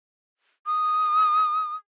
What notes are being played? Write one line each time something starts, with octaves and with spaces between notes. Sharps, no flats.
D#6